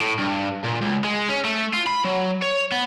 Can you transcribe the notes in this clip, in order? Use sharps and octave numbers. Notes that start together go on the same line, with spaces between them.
A2
G2
A#2
C#2
G#3
C#4
A3
F4
B5
F#3
C#5
B3